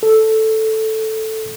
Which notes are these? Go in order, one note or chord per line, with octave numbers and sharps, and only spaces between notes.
A4